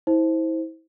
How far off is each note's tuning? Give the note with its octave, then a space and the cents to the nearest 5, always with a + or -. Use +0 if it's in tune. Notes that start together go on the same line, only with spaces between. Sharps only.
E4 -30 C5 +0